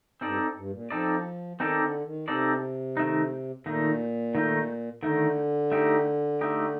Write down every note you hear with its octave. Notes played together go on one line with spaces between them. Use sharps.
G2 C4 D#4 A4 D5
G2
A#2
F3 C4 D#4 A4 D5
D#3 C4 D#4 A4 D5
D3
D#3
C3 C4 D#4 A4 D5
D#3 A3 D#4
A#2 D#3 A3 D#4
D#3 A3 D#4
D3 D#3 A3 D#4
A3 D#4 G4
A3 D#4 G4